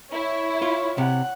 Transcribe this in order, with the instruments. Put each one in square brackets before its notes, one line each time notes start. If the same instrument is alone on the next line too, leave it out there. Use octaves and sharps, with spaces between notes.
[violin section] E4 [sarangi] C#5
[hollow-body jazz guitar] F4
[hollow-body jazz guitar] C3 [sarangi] F#5